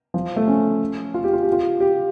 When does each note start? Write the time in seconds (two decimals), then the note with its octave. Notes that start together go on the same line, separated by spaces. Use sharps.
0.14 F3
0.36 A3
0.47 C#4
1.14 F4
1.24 G4
1.33 F4
1.43 G4
1.52 F4
1.80 G4